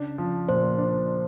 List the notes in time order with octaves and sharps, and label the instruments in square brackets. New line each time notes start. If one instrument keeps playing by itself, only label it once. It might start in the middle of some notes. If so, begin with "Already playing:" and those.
Already playing: [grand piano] C#3 D4
F3
[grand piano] A#2 [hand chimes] C5
[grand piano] D4